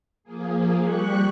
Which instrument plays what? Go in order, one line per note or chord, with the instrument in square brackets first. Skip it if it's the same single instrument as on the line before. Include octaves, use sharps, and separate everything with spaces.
[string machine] F3 A#3 G#4
G3 G4 C#6 F#6